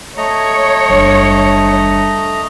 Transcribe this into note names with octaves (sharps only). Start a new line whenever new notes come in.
A3 C#5 D#5 A#5
F#1 D#2 G3 D4